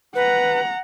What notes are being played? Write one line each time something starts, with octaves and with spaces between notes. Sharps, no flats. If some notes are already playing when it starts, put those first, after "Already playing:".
B4 F#5 A#5